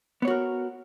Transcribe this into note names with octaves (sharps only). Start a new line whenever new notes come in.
B3 F#4 A#4 C#5